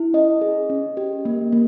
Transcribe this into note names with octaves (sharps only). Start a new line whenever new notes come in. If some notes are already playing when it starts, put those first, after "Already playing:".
Already playing: E4
C#4 D#5
G#4
C#4
G4
A#3
A#3